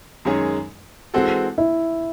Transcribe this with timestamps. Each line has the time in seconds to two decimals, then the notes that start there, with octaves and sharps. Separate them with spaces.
0.25 F#2 D#3 G#3 C#4 G#4
1.14 E3 G#3 C4 F#4 A4
1.58 E4